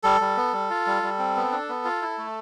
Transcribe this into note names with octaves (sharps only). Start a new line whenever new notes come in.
G3 A4
G3
B3
G3
F4
G3
G3
C4
B3
D4
B3
F4
E4
A3